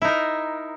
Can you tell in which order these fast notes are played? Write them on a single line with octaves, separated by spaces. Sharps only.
E4 D#4 A#4